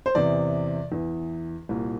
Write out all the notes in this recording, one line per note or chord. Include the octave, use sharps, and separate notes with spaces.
C5
E2 C3 E3 D5
E2 E3
C2 A#2